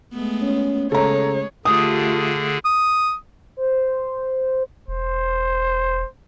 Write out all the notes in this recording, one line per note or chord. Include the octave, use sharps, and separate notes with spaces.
G#3 A3 B3
C#4
C#3 G#3 A4 C#5 A#5
D3 A3 F4 G4 G#4 D#6
D#6
C5
E1 C5